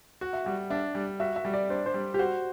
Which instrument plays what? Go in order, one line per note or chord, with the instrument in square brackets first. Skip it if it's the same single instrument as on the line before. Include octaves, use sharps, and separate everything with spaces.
[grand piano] F#4 [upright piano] F#5
[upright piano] E5
[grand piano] G3 [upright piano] F#5
[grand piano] D4 [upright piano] E5
[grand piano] G3
[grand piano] F#4 [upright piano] E5
[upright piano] E5
[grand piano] G3
[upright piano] D5
[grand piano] D4 [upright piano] C5
[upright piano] C5
[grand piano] G3
[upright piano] G4
[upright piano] F#4 [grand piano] C5